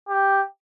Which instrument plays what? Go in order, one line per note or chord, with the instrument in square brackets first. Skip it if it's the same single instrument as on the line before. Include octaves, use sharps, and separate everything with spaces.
[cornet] G4